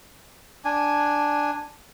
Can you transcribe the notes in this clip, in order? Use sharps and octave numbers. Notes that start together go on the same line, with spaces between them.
D4 G#5